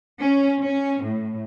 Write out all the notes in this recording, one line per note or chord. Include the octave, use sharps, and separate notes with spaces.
C#4
C#4
A2